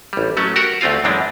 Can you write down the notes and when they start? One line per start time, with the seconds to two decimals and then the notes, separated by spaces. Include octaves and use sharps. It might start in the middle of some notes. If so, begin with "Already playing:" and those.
0.13 A1 G3
0.37 F#3 A3 C#4
0.56 F#4 G4 A#4 F#5
0.81 D2 A3 C4 F4 F5
1.04 F#2 E3 G#3 C4 D4